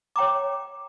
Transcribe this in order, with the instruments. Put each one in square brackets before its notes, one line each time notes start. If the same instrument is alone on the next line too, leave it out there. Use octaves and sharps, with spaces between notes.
[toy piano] C#5 G5 A#5 D6